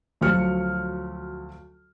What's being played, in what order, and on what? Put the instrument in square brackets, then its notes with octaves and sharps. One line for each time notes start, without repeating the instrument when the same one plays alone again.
[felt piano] D2 F3 F#3 F6 C#7